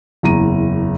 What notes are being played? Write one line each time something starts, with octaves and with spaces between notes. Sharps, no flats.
F#1 E2 A#5 D#7